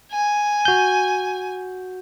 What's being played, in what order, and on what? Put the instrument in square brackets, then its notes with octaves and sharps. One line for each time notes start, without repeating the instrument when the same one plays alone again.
[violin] G#5
[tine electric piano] F#4 G6